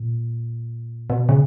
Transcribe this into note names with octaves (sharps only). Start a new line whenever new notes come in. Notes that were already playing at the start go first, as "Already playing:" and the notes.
Already playing: A#2
B2
C#3